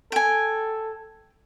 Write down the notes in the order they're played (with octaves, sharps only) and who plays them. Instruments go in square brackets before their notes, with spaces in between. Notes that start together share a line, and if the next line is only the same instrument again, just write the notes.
[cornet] A4 [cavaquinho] G5 G#5